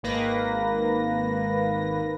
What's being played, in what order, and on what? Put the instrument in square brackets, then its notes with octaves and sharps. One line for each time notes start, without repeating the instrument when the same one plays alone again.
[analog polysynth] G#1 D#3 A#3 B4 A#6